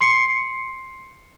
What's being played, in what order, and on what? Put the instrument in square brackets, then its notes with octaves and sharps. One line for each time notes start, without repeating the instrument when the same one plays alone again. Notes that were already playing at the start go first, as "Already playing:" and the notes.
[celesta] C6 C7 C#7